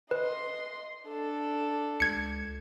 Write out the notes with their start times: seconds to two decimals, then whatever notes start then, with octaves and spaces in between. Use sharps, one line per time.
0.11 B4 D#5 C6
1.06 D4 A4
2.00 C#2 G#6 C#7